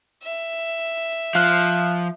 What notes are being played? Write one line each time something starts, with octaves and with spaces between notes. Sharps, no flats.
E5
F3 F5 F6 F#6